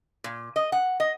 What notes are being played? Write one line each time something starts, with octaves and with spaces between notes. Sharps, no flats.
A#2
D#5
F#5
D#5